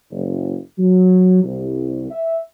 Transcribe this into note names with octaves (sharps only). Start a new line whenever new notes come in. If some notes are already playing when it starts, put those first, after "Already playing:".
F#1
F#3
C2
E5